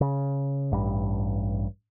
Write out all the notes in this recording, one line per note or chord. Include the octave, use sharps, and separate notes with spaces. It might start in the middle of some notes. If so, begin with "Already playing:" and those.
C#3
A1 G2